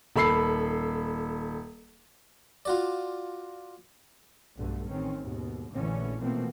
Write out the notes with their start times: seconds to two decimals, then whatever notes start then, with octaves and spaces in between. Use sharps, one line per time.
0.16 D#1 A4 B5 E6 C7
2.65 F4 F#4 D5
4.55 B1 G2 D3 A3
4.89 A1 D#3 C4 C#4
5.19 D#2 G#2 B2
5.71 A#1 A#2 D3 E3 A3 C#4
6.19 B2 E3 F3 A3 A#3 C4